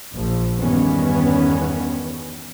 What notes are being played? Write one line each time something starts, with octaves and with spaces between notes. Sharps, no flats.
A#1 F3
E2 G2 D#3 B3 C#4